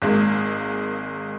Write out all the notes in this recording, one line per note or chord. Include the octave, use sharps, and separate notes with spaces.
G#1 G#3 A#3